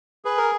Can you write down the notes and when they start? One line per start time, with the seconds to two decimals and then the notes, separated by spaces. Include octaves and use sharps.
0.25 G#4 B4
0.38 A#4